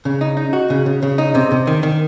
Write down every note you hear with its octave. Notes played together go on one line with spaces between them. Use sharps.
C#3
D#4
D#4
F#4
C#3
C#3
C#3
D#4
C3
C3
D#3
D#3